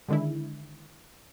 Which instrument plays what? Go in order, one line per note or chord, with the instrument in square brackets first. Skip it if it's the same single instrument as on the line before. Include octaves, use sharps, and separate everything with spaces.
[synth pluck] D3 D#3 G#3 D4 E4